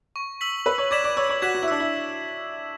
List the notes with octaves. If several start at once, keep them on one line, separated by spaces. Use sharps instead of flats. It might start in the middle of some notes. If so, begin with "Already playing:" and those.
C#6
E6 B6 F#7
B4 E6
C#5
D5 G#6 B6 E7
D5
C#5 E6
C#5
F#4 G#6 B6 E7
F#4
E4
D4 E6
E4